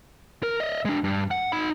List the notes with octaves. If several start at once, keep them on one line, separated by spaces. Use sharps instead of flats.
A#4
D#5 E5
G#3 D4
G2
F#5
D#4 B5